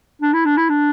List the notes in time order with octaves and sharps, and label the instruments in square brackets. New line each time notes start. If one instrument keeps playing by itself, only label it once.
[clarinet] D4
E4
D4
E4
D4